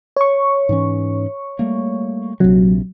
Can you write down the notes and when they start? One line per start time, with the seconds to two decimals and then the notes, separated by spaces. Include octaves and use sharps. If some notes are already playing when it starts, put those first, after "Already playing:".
0.16 C#5 C#6
0.69 G#2 E3 C#4
1.59 G3 A3 A#3
2.40 A#1 C3 F#3